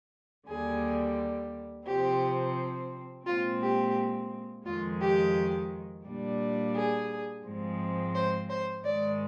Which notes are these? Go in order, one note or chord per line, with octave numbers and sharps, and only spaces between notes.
D#2 D3 G3 G#4
C3 F3 C4 G4
A#2 G#3 C4 F4
G4
F2 D#3 G#3 F4
G4
A#2 G3 D4
G#4
G#2 F3 G#3 C4
C5
C5
G#2 D#3 G#3 D5